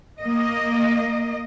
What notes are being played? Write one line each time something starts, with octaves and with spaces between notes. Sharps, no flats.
A#3 D#5